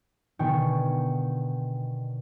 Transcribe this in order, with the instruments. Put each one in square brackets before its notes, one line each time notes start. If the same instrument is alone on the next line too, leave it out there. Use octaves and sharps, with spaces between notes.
[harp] B2 D3 D#3 G5 G#5 C#6